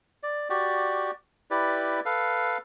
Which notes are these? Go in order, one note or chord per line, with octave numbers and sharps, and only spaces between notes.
D5
F#4 G4 D5
E4 G4 B4 D5
A4 B4 F5